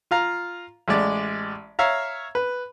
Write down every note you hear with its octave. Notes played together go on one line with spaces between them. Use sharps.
F4 F5 A#5
A1 G#3 D5
C#5 E5 F5 A#5
B4